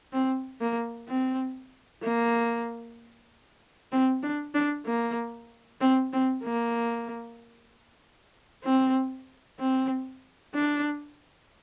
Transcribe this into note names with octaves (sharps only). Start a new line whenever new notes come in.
C4
A#3
C4
A#3
C4
D4
D4
A#3
C4
C4
A#3
C4
C4
D4